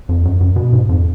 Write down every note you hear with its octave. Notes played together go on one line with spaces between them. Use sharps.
F2
F#2
F#2
B2
G#2
F2